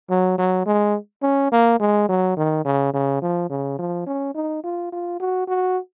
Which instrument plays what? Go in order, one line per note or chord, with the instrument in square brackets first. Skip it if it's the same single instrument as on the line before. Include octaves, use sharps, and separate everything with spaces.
[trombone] F#3
F#3
G#3
C#4
A#3
G#3
F#3
D#3
C#3
C#3
F3
C#3
F3
C#4
D#4
F4
F4
F#4
F#4